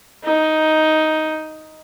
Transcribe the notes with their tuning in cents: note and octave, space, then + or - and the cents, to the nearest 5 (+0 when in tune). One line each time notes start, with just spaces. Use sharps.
D#4 +5